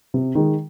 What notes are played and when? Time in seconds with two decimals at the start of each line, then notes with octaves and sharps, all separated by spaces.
0.14 C3
0.35 D#3 G#3